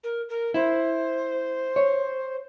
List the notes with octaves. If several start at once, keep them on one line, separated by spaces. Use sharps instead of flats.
A#4
A#4
E4 C5
C#5